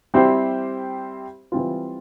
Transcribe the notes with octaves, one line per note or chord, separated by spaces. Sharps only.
G3 C4 E4 G4 C5
E3 G3 C4 F4